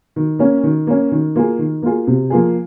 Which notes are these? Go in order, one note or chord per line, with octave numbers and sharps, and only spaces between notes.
D#3
A#3 C#4
D#3
A#3 C#4
D#3
A#3 F4 G#4
D#3
A#3 F4 G#4
C3
F3 A#3 F4 G#4